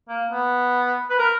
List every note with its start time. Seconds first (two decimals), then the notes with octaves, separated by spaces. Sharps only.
0.09 A#3
0.31 B3
1.10 B4
1.19 A#4